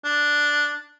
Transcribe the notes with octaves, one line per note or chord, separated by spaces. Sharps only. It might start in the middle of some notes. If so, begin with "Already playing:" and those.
D4